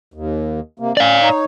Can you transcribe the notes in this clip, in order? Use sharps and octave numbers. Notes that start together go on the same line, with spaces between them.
D#2
C3 A#3
C#4 D5 F5
D#4 C#5